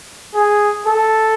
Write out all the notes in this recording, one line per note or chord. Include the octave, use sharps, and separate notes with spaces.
G#4
A4